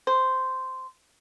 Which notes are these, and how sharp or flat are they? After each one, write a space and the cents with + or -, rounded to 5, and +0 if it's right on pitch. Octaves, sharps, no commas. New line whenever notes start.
C5 -10